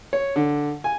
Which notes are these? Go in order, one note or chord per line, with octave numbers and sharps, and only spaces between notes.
C#5
D3
G#5